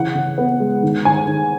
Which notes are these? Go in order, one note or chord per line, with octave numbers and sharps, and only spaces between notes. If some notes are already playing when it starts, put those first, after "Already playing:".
Already playing: C#3 E3 F#5
C#3
B3
G#3
D#3
D#3 G#5
D#3